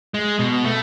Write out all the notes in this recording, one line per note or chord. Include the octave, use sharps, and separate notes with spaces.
G#3
B2
A3